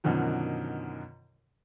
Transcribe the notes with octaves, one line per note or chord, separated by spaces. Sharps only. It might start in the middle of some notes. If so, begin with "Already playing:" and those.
F#2 B2 D3 D#3 F3